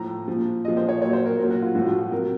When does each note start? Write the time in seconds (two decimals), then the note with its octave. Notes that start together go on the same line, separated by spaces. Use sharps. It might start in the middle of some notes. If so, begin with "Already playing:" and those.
Already playing: A2 F3 A#5
0.28 A#2 F3
0.65 A#2 F3 D#5
0.77 C5
0.89 C#5
1.01 A#2 F#3 C#5
1.13 C5
1.26 A#4
1.37 A#2 F#3 A#4
1.50 F#4
1.62 F4
1.75 A2 F3 F#4
1.87 F4
1.99 F#4
2.11 C3 F#3 A#4